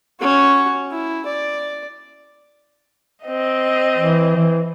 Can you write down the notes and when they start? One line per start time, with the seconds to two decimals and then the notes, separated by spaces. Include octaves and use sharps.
0.20 C#4 F#4
0.91 E4
1.25 D5
3.24 C4 D#5
3.98 E3
4.36 E3